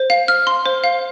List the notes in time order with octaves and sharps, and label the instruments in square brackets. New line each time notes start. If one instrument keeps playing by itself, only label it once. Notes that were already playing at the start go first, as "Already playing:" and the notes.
Already playing: [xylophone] C5
F5
F6
C6
C5
F5